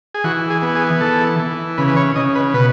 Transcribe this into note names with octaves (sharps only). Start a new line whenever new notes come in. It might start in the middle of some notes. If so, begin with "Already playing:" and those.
G#4
E3 F#4
G#4
B3
G#4
E3 A4
E3
C#3 B4
B4
C#5
C#3 D#5
B4
B2 B4